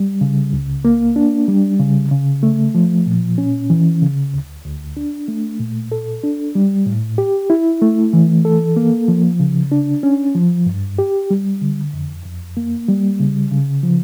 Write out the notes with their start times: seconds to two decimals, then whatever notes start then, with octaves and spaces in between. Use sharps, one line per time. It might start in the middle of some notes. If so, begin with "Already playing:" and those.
Already playing: G3
0.21 C#3
0.53 C#2
0.85 A#3
1.16 D4
1.48 G3
1.80 C#3
2.11 C#3
2.43 A3
2.75 F3
3.07 A#2
3.38 C#4
3.70 E3
4.02 C#3
4.34 D2
4.65 D2
4.97 D4
5.28 A3
5.60 A#2
5.92 A4
6.23 D4
6.55 G3
6.86 A2
7.18 G4
7.50 E4
7.82 A3
8.13 E3
8.45 A4
8.76 A#3
9.08 F3
9.40 C#3
9.72 D4
10.03 C#4
10.35 F3
10.66 G2
10.99 G4
11.30 G3
11.61 D3
11.93 F2
12.25 F2
12.57 A#3
12.88 G3
13.20 C#3
13.51 C#3
13.83 F3